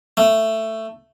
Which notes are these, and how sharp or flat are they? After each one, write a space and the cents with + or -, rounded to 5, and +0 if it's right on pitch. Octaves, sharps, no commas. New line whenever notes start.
A3 +10